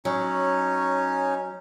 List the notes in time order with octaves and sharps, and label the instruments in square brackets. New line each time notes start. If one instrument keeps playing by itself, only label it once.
[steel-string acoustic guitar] F#3 [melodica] C#4 D#4 C#5